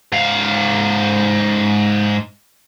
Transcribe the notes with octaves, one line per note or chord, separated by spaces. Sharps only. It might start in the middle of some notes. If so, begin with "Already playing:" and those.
G#2 F5